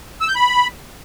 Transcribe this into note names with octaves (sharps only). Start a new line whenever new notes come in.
E6
G6
B5